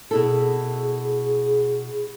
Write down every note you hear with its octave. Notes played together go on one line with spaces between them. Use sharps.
B2 E4 G#4 A4